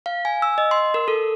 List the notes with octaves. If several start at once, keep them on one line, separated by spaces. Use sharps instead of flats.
F5
G#5
E6
D#5
C6
A#4
A4